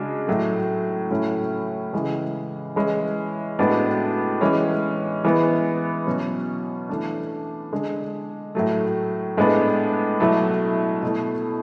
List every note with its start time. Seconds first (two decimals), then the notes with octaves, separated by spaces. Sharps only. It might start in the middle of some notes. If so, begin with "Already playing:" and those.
Already playing: C#3 G#3 D4 F#4
0.27 A2 F#3 A3
1.11 A2 F#3 A3 C#4 E4
1.93 C#3 E3 G#3
2.76 E3 G#3 C#4 E4
3.59 A2 G#3 B3 D4 F#4
4.41 E3 G#3 C#4
5.25 E3 G#3 B3
6.07 B2 F#3 C#4
6.89 E3 A3 D4
7.73 D3 G#3 D4
8.55 A2 F#3 A3
9.37 A2 G#3 B3 D4
10.20 B2 F#3 A3 E4
11.03 B2 A3 E4